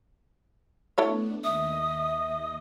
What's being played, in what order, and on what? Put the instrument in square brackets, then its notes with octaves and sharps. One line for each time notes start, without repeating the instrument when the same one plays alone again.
[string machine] A3 B3 D4 [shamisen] E4 A4 C#5
[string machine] D#2 D#5 [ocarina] E5 [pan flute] D#6